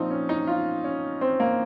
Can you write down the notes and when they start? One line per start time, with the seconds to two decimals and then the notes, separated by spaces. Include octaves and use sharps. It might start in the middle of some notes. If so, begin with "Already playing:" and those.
Already playing: A#2 F3 C4 D#4
0.10 C#4
0.29 D#4
0.47 F4
0.84 C#4
1.21 C4
1.40 A#3